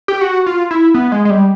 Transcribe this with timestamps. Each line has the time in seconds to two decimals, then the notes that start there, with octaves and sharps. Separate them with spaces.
0.08 G4
0.21 F#4
0.46 F4
0.71 E4
0.94 B3
1.12 G#3
1.25 G#3
1.30 G3